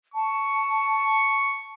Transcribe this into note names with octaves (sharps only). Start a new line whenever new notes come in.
A5 C#6